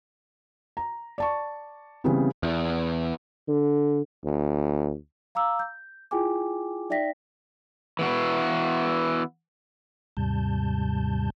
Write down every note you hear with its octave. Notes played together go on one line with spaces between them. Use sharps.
A#5
D5 A5 C#6
C#3 E3 G3 B3 C4
E2
D3
D2
F5 A#5 D6 E6
G6
E4 F4 G#4 G5 G#5 D6
D#4 D5 E5 G5 A#6 B6
E3 B3 F#4
D#2 G#2 C3 G3 A5 G6